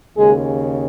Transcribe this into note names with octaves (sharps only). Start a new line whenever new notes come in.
D#2 C#3 G#3 G#4